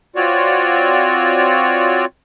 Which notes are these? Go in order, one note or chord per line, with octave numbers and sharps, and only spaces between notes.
C4 F4 F#4 C#5 D5